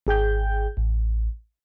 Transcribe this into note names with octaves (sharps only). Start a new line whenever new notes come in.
G#1 G#4 G5 G6
A1